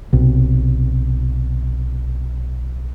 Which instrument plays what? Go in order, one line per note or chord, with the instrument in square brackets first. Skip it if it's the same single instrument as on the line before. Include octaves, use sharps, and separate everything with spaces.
[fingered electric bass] B1 C3